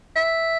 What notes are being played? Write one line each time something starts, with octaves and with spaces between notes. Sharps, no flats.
E5